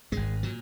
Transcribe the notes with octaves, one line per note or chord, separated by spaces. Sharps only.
G#1 G#2 G#3
A#2 F#3